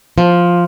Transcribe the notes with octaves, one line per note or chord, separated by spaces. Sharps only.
F3